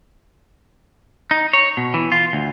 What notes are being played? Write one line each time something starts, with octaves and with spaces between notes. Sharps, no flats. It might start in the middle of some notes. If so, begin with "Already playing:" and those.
D#4
C#5
B2
E3
F4
D2